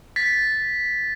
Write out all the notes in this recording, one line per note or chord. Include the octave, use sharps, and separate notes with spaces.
A6 B6